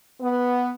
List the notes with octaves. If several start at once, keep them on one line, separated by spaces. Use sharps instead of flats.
B3